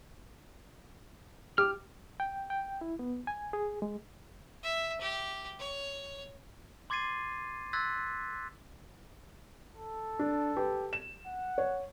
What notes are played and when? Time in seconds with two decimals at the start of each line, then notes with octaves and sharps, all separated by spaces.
1.58 G4 D6 F6
2.20 G5
2.50 G5
2.81 E4
2.99 B3
3.27 G#5
3.53 G#4
3.82 G#3
4.63 E5
5.01 G4
5.59 C#5
6.90 C6 D6 G#6 A6 C7 D#7
7.73 C6 E6 F#6 G#6 A6 B6
9.75 A4
10.19 D4
10.56 G4 B4
10.93 E7
11.26 F#5
11.58 C#5